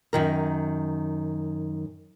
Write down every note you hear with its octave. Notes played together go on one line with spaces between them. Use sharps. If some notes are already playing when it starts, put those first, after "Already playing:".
F#2 D#3 A#4